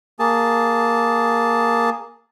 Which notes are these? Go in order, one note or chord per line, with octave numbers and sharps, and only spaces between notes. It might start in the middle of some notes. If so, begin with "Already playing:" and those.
A#3 G#4 A5